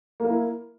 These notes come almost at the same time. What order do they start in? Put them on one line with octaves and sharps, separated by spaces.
A#3 A#4 E4